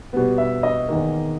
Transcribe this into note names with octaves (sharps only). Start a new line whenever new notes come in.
B2 G3 B3
E5
D#5
E2 D#3 A#3